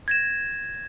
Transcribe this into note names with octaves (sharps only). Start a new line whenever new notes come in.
G#6 A#6 E7